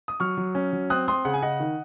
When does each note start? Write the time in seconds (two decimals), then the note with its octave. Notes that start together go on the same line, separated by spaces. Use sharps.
0.08 D#6
0.20 F#3 C#6 F6
0.37 F#3
0.55 C#4
0.73 F#3
0.90 C4 D#6 F#6
1.08 C4 C6 D#6
1.25 C#3 F#5
1.34 G#5
1.42 C#3 D#5 F#5
1.60 D#3